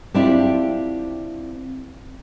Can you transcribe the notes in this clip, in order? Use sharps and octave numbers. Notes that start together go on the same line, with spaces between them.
C4 D4 E4 F4 G4